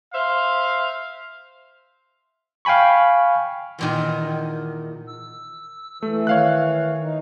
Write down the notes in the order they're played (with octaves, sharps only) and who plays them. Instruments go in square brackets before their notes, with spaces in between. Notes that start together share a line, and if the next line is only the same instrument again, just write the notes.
[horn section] C5 E5 F5
[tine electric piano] F5 G5 G#5 B5 C#6
[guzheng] E2 A#2 D#3
[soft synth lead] E6
[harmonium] E3 [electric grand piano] A3
[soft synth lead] D#3 [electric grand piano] C#5 F5 F#6
[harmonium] D#4